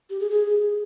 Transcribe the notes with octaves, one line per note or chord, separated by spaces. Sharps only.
G4
G#4
G#4